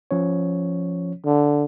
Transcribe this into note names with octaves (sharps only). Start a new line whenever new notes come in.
F3 C#4 C#5
D3